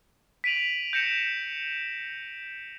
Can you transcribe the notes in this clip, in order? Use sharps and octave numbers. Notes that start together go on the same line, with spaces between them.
B6 D7 D#7 F7 F#7
G6 A#6 C#7 E7